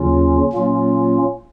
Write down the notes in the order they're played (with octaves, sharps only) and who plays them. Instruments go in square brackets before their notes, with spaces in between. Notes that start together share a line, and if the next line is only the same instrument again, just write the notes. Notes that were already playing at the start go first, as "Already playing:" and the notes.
Already playing: [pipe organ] D#2 C#3 F#3 C#4 F4
A#2 F#3 A#3 C#4 F4